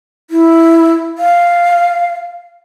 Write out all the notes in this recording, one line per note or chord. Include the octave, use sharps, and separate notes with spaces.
E4
F5